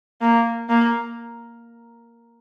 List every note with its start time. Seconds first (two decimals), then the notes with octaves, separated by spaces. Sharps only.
0.21 A#3
0.69 A#3